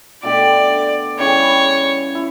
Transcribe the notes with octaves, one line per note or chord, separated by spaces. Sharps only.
B2 A3 D4 G4 D5
C#3 E3 G3 C#5
E4